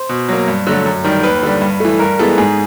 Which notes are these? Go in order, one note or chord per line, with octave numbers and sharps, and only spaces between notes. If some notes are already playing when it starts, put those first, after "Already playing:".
Already playing: C5
B2
F#3 A#3
G2
D3 F#3 A3
F#2
D#3 G3
D#2 B4
D3 G3
G2
E3 A3
G2 A#4
E3 G#3 B3 A4
G#2 G#4